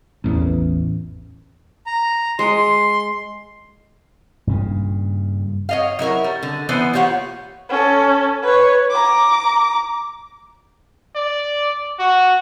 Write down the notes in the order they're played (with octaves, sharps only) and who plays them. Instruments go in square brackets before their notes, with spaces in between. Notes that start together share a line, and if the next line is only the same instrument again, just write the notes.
[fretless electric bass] A1 E2
[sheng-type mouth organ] A#5
[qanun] G#3 [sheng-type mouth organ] C6
[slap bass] G2 A#2 C#3
[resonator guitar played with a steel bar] C#5 D#5 F5
F#3 E4 A#4 C#5
G3
D3
E3 B3 C5 D5
A#3 F4 G4 C#5 F#5
[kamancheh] C#4 A4
B4 C#5
A#5 D6
[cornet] D5
F#4